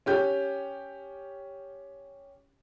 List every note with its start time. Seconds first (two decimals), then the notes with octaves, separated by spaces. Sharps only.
0.06 C#4 G4 G6